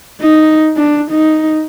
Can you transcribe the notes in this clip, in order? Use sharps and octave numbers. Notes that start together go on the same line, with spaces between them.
D#4
D4
D#4